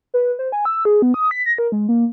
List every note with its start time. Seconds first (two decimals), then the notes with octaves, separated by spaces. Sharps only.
0.14 B4
0.39 C5
0.52 G#5
0.65 E6
0.85 G#4
1.02 B3
1.14 D#6
1.31 B6
1.46 A#6
1.58 A#4
1.72 G#3
1.89 A#3